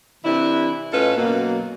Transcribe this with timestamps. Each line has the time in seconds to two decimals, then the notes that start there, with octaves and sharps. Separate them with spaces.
0.25 C3 E3 D4 E4
0.93 A2 C#4 F4 A4 B4 D#5
1.17 F#2 B2 F#3 A#3